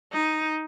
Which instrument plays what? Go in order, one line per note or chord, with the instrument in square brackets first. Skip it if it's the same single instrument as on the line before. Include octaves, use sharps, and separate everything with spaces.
[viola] D#4